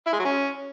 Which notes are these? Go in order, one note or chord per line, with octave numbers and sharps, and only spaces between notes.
E4
G#3
F#3
C#4